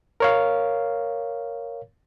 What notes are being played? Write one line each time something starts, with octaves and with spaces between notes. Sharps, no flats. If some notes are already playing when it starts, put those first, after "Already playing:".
A#4 C#5 F5